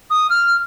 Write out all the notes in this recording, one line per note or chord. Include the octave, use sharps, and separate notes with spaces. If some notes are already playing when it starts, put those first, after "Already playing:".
D#6
F6